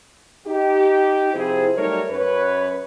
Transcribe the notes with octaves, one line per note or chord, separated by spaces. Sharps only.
D#4 G4
C3 F3 C4 E4 G#4 C5
F#3 G3 A3 D#4 A#4 C#5
F#2 B4 C#5